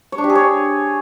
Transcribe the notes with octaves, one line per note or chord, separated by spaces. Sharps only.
C#5
D4
G4
G#4
C#5